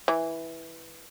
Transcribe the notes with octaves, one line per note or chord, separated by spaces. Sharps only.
E3